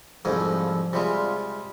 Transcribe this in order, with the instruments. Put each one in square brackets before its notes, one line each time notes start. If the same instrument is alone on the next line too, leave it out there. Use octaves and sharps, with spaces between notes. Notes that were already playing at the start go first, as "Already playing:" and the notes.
[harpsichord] C2 F2 G#2 [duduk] F3
[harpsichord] C3 G3 G#3 [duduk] F4